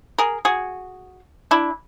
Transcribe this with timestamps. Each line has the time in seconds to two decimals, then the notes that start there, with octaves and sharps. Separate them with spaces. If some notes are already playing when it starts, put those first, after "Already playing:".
0.18 G#4 A#4
0.45 F#4 G#4
1.51 D4 E4